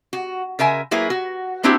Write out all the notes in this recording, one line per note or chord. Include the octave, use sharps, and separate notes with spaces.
F#4
C#3 A#4 E5 G#5
F#3 A#3 E4 G#4 B4
F#4
A#3 C4 D4 E4 F#4 G4